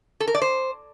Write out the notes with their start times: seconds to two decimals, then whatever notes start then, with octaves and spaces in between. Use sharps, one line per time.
0.20 A4
0.27 A#4
0.35 D5
0.42 C5